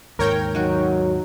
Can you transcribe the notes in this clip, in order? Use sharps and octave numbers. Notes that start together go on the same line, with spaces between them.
D#2 G#2 A#4 C#5 G5
D#3 F#3 F#4